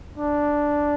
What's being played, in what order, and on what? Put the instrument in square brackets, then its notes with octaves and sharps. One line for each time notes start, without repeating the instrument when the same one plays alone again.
[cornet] D4